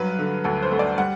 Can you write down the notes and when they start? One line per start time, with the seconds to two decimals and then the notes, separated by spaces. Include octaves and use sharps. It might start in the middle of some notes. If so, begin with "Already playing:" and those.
Already playing: G2 F#3 B4
0.19 D3
0.44 D2 A4
0.62 C5
0.71 A3
0.79 D5
0.98 G3 F#5